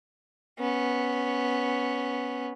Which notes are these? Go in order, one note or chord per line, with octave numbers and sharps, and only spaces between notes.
B3 C#4